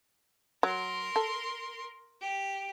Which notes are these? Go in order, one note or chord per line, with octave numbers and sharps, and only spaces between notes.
F#3 A#4 C6
A4
G4